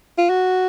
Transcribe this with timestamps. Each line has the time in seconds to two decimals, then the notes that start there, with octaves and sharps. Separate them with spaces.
0.18 F4
0.29 F#4